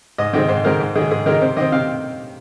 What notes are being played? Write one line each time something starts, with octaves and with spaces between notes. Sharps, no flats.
G#2 D#5
D#3 G#3 C4 D#5
G#2 C5
D#3 G#3 C4 A#4
G#2
D#3 G#3 G#4
G#2 G#4
D#3 G#3 A#4
C3 C5
D#3 C4 D#5
C3 F5